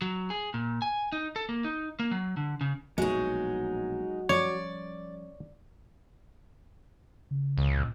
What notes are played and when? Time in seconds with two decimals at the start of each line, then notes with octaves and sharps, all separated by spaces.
0.02 F#3
0.30 G#4
0.54 A#2
0.82 G#5
1.12 D#4
1.36 A4
1.49 A#3
1.64 D#4
2.00 A#3
2.11 F#3
2.37 D3
2.61 C#3
2.98 A#1 B2 F#3 G#3 D#4
4.29 F3 G3 C#4 C#5 D5
7.31 C#3
7.58 C#2
7.76 A#2